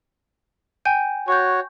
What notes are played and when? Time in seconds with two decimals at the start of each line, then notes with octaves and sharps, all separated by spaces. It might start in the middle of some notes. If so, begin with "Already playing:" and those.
0.85 G5 G#5 G6
1.28 F#4 C#5 C#6 G6